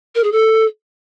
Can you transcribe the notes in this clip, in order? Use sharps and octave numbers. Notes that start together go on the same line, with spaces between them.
A#4
G#4
A4